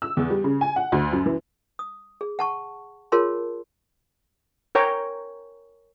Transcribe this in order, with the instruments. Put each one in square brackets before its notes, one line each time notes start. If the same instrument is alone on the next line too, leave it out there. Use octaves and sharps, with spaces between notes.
[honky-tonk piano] E6
E2
G3
C#3
G#5
F#5
D2
F#2
E3
[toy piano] D#6
G#4
F#5 A5 C#6
F4 G#4 A#4 C#5 A5 C6
[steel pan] A#4 C#5 G5 A#5